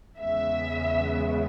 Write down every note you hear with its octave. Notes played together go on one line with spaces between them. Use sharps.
E2 C#3 G#3 B3 E5